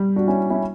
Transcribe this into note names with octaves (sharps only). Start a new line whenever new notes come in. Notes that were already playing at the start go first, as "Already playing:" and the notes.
Already playing: G3
D4 F#4
C#4 E4
C#4 E4